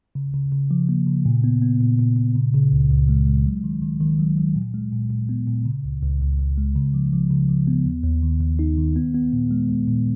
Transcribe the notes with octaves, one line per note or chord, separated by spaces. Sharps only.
C#3
C#3
C#3
F3
A#3
C#3
A#2
B3
B3
A#2
A#2
A#2
C#3
C#3
C#2
C#2
G#3
G#3
F#3
D#3
D#3
D#3
F#3
F#3
A#2
G#3
A#2
A#2
B3
A#2
C#3
C#2
C#2
C#2
C#2
G#3
C#3
F3
F3
C#3
F3
B3
D#2
D#2
D#3
D#2
D#4
D#3
B3
B3
A#2
G#3
G#3
A#2